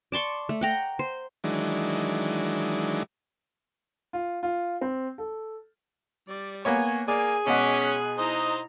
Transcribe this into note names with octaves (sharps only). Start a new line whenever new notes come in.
D5 A5 C6 C#6
A3
F#5 G5 A#5
C5
D#3 E3 F#3 G#3 D4
F4
F4
C4
A4
G3 D5
A#3 B3 C#5 G#5
A#3 G#4 D5 G#5
B2 G#3 C#4 F#5 D6 B6
F#6
D#4 E4 C5 A#5 D#6